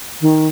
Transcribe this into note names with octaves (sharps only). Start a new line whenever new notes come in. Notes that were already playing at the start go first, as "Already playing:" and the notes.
D#3